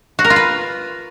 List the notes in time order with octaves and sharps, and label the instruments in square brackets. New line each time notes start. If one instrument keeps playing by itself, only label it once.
[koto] F#4
A#4
F4
B4